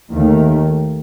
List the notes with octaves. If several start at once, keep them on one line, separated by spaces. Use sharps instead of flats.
D#2 D#3 A3